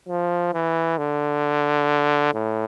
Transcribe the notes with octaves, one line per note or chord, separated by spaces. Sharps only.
F3
E3
D3
A2